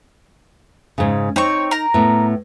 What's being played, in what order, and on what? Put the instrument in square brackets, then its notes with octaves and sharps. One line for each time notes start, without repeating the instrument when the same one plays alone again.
[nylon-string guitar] G#2 C#3
[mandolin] C4 C#5 C#6 [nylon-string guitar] D#4
[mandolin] A#4 A#5
[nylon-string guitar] A2 B3